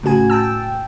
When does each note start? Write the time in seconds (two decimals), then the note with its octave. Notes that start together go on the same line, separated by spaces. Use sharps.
0.03 A2 C#3 F#4 G#5
0.30 G5 A5 E6